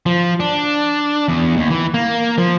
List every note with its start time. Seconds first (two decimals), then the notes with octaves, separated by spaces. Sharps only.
0.06 F3
0.40 D4
1.28 E2
1.57 D#2
1.70 E3
1.94 A#3
2.38 F3